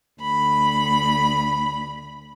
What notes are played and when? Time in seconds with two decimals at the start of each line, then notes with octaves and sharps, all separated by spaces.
0.20 D2 B5